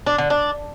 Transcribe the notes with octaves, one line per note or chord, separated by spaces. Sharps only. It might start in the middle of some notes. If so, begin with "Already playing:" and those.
D4
D3
D4